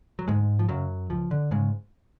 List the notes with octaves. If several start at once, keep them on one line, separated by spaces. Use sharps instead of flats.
F#3
D2 G#2 G#3
F3
F#2 C#3 F#3
C#2 F3
D3
G#2 C#3 G#3